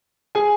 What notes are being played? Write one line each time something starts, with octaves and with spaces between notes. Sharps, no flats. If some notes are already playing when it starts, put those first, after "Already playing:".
G#4 G#5